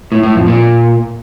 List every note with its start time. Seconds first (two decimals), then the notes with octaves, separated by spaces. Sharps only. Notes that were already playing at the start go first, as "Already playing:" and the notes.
0.12 A2
0.23 A2
0.35 F2
0.47 A#2